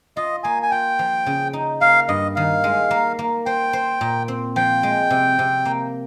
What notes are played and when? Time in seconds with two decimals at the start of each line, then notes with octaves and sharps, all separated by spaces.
0.17 F4 D#5
0.44 A#3 G#5
0.63 G#5
0.71 F4 G5
0.99 F3
1.26 C#3
1.53 D#4
1.81 A#3 F5
2.09 G2 D#5
2.36 D#3 F5
2.64 G#3
2.91 A#3
3.19 A#3
3.46 C5 G5
3.73 C5
4.01 A#2
4.28 C4
4.56 F3 G5
4.83 G#3
5.10 C3
5.39 C3
5.65 A#3